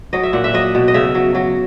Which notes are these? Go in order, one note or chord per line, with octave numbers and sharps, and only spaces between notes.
F#3 D#5
E5
A#2 F#5
E5
F#3 D#5
B2
D#5
C#3 E5
F#3
F#3